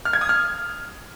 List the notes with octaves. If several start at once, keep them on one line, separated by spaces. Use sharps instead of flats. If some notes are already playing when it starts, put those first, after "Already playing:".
F6
G#6
D#6
F6